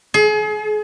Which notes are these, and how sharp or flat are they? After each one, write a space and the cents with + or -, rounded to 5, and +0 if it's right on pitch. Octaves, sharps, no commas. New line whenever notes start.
G#4 +35